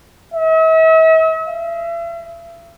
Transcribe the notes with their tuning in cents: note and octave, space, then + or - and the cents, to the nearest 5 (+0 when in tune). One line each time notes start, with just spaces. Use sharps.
E5 -45
E5 +40